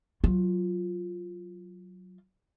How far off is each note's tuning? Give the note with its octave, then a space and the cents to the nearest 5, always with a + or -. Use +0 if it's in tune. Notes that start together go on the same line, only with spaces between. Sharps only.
F#3 +0 F4 +0